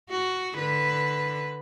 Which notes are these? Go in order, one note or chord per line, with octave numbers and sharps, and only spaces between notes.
F#4
D3 B4